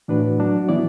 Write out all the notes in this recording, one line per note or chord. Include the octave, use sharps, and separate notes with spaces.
A2 E3 D4 F#4 B4
F#3 D4 F#4
E3 B3 E4 D5